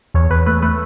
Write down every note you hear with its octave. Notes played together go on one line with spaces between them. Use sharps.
E2 C#5
E2 B4
A3 B4
A3 B4